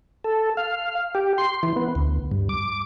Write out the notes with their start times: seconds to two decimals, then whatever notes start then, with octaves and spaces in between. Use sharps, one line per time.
0.24 A4
0.57 F5
1.15 G4
1.38 C6
1.63 E3
1.76 B3
1.95 D2
2.32 G2
2.49 D6